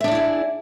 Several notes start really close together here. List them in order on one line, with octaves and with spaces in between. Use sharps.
E5 D4 D5 E4 G#4